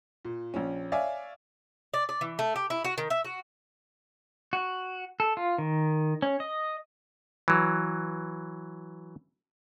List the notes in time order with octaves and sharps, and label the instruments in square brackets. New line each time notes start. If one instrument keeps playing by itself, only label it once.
[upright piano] A#2
A#1 C#4
C#5 D5 E5 F5 G#5
[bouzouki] D5
D5
E3
A3
G4
E4
F#4
D#3
E5
F#4
[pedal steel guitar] F#4
A4
F4
D#3
C#4
D#5
[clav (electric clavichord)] E3 F#3